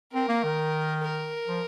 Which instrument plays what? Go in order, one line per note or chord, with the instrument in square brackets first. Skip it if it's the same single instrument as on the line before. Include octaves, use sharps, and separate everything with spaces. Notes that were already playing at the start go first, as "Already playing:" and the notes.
[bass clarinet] C4 [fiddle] A#4
[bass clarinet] A#3
D#3
[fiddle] A#4
[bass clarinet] F3